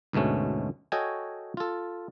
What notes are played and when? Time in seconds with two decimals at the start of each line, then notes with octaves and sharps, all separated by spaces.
0.13 D2 G#2 B2 A3 C#4
0.92 F#4 A4 C#5 D#5 G5 G#5
1.57 F4 A4